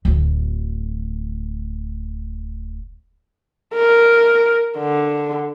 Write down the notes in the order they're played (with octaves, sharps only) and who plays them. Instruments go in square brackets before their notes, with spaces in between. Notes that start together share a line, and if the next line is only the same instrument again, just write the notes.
[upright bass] D1 D2
[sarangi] A#4
D3